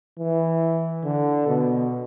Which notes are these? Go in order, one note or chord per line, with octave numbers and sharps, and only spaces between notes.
E3
D3
B2